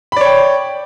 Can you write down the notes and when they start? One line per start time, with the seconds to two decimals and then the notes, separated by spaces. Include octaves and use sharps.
0.12 B5
0.17 D5
0.21 C#5
0.25 G5